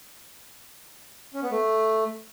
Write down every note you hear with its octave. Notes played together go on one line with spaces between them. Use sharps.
C#4
B3
A3